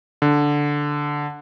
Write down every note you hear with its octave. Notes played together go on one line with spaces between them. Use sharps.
D3